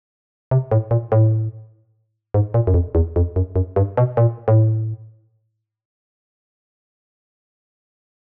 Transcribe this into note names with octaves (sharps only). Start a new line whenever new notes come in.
C3
A2
A#2
A2
G#2
A#2
F#2
F2
E2
F2
F#2
F#2
G2
B2
A#2
A2